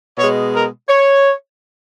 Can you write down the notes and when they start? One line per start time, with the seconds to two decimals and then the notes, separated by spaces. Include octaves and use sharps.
0.17 B2 G#3 C#5
0.53 A#4
0.89 C#5